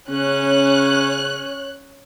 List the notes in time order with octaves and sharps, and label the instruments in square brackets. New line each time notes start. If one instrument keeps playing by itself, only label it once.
[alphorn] C#3 [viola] C#4 [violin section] C#5 F#6